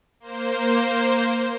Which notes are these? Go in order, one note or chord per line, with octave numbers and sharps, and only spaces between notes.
A#3 C5